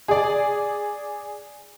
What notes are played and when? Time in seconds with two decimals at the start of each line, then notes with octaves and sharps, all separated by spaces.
0.08 G#4 D5